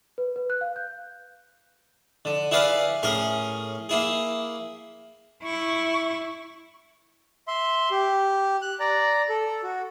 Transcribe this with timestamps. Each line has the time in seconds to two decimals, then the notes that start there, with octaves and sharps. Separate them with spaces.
0.18 B4
0.36 B4
0.50 F#6
0.61 F5
0.76 G6
2.25 D3
2.51 E4 G#4 B4 D5 F5
3.03 A2 C#4 G#4 A#4 A#5
3.89 A#3 E4 G#4
5.43 E4 C#6
7.48 E5 C6
7.91 G4
8.62 F#6
8.80 D5 A#5
9.29 A4
9.63 F#4